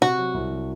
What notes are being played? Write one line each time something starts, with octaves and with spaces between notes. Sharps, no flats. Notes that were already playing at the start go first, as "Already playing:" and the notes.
C3 F#4
F#3
C2
F#3